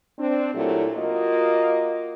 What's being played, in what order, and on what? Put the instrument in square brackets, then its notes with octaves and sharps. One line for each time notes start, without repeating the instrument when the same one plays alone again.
[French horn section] C4 D4
A#2 F#3 A3 E4 G4
A#3 F4 F#4 D#5